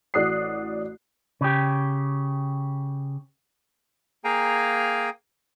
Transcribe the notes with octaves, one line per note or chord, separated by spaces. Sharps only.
A1 F#4 D5 D#6 F#6 C7
C#3 G4
A#3 G#4 F5 G5 G#5 A#5